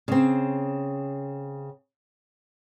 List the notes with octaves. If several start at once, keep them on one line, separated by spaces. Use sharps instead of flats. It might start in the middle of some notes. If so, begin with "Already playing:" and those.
C#3 C4